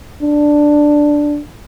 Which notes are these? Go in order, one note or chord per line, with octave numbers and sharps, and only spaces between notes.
D4